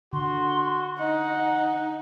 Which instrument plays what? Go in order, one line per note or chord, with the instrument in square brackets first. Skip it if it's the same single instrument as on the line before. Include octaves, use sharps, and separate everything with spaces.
[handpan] D3 [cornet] F#4 [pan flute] C6
[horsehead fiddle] D#4 [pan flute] D#5 [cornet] F#5